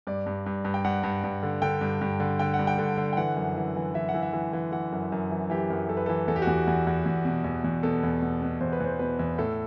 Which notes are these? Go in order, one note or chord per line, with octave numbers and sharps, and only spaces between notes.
G2 D5
G2
G2
G2
G5
G2 F#5
G2
G2
D3
D3 G5
G2
G2
D3
D3 G5
F#5
G2
G5
D3
D3
G5
E3 F#5
F#2
E3
E3
E3 E5
F#5
E3
E5
E3
E3
E3 F#5
F#2
F#2
E3
E3 G4
F#2
F#2 A4
B4
A4
E3
E2 A4
G4
F#4
E2 G4
E2
E2
E2
B2
E2
E2
B2 A4
E2
B2
B2
E2 C5
B4
E2 C5
B2 B4
E2
A2 A4